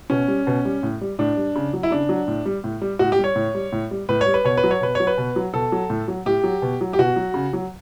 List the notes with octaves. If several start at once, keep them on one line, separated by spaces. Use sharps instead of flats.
B2 C#4
G3
B2
G3
A2
G3
A2 D4
G3
C#3
F#3
E4
C#3 D4
F#3
A2
G3
A2
G3
A2 F#4
G4
G3
C#5
A2
G3
A2
G3
A2 B4
C#5
G3
B4
B2 C#5
B4
F#3
C#5
B2 B4
F#3 C#5
B4
B2
F#3
B2 A4
F#3
A2
F#3
A2 G4
F#3
B2
F#3
G4
B2 F#4
F#3
C#3
F#3